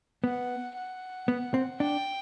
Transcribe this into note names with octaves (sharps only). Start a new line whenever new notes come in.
B3 F#5
F#5
B3
C4
D4 G5